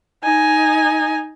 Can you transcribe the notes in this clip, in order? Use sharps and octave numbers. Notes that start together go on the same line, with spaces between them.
D#4 G#5